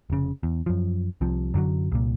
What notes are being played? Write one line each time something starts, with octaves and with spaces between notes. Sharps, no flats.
F1 C#3
E2
F#2 F3
C2 C3 F3
F#2 D3 D#3 F#3
C2 A#2